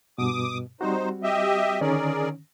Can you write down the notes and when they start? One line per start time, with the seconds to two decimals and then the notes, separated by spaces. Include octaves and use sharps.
0.18 G2 B2 D6 D#6
0.81 G3 C4 D#4 F#4 C5
1.23 G4 D#5 E5
1.81 D3 D#3 C#4 G#4 A#4 D5